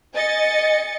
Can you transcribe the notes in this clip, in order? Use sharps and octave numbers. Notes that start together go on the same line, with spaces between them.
D#5 G#5 A6 C#7